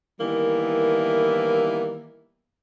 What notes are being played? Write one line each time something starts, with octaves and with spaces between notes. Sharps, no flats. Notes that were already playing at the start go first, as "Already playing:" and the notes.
D#3 E3 G3 A#3 B3 E4